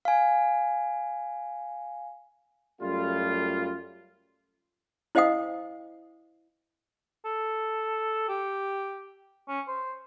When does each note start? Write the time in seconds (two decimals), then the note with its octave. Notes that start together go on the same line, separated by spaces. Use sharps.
0.05 F5 G#5
2.81 F#2 G3 A3 F4
5.15 E4 C5 D#5 F5 G5 D#6
7.25 A4
8.29 G4
9.49 C#4
9.68 C5